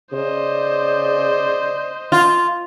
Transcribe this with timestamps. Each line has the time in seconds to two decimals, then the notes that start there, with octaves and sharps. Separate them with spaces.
0.13 C#3 C5 D5 D#5
2.12 F4